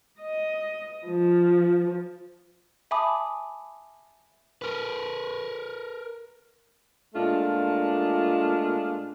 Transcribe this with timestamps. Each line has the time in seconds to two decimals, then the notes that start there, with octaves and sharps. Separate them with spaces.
0.21 D#5
1.07 F3
2.91 E5 G#5 A5 B5 D6 D#6
4.62 A#4 B4
7.15 A#2 G#3 A3 D4 F4